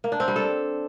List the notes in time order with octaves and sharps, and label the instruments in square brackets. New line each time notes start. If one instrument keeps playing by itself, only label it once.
[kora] A#3
D4
C4
G3
A4